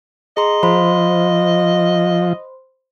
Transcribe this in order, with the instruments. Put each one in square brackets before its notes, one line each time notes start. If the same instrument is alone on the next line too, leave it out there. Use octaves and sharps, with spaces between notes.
[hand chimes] G#4 A#5 C6 [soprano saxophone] D#5
[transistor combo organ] F3 [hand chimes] C5 B5 C6